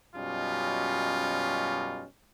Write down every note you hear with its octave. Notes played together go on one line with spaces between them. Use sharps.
F#2 B2 G3 C#4 D#4 F4